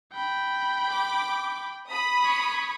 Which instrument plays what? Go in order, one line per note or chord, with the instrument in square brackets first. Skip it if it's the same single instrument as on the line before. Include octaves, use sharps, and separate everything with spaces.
[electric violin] G5 B5
[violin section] D6
B5 D#6
[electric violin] C#5